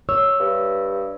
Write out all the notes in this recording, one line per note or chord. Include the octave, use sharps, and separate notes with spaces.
C#5 E6
G2